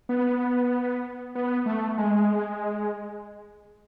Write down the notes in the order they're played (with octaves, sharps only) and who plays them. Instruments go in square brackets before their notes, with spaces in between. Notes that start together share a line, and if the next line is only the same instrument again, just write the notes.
[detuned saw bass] B3
B3
A3
G#3